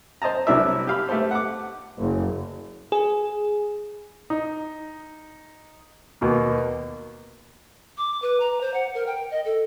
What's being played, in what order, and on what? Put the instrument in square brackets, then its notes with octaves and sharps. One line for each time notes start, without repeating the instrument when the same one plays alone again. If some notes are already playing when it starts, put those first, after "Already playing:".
[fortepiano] C5 D#5 A5 A#5
C2 F#3 D4 E4 A#4 E5
G4 F5 B5
A3 G4 A4 C5
F#5 D6
[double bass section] F#1
[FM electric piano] G#4
[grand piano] D#4
D#2 B2 A#3
[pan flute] D6
B4
A#5
C5
F#5
A#4
G5
D#5
A4